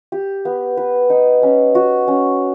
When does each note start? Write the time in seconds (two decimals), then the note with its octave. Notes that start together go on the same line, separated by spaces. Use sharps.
0.12 G4
0.45 B3
0.77 B4
1.10 D#4
1.43 C#4
1.75 F#4
2.08 C#4